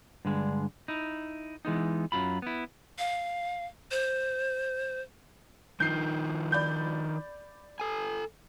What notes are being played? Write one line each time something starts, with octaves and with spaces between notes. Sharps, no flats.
G2 D3 G#3
D#4 E4
E3 G#3 B3 D#4
F#2 F#3 F4 B5
B3 E4
F5
C5
D#3 F3 D#4 G6 C7
D5 B5 G6
A4 G#5